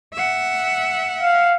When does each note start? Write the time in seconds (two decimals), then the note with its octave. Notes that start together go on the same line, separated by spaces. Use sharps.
0.13 E5 F#5
1.21 F5